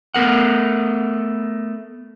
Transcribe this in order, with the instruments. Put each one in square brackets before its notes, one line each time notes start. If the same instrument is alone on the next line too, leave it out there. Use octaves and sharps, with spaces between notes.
[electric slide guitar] A3 B3 A#4 F#5